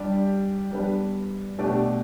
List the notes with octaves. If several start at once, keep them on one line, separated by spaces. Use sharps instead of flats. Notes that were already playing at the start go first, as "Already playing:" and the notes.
Already playing: G3 D4 G4 D5
G3 B3 D4 B4
B2 A3 D4 G4 D5